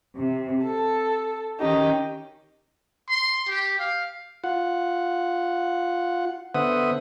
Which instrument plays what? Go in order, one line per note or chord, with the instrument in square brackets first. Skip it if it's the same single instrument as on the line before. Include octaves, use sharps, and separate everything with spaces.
[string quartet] C3
A4
D#3 C#4 D#4 G4
[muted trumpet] C6
G4
F5
[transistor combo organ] F4 F#5
D3 B3 C5 E5 F#5 D#6